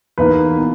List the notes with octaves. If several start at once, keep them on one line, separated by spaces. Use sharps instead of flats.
E2 B2 A#3 D#4 B4
B2